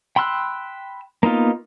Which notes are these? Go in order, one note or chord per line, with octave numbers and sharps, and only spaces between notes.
G5 B5 C6 E6 F#6
A#3 B3 D#4 F4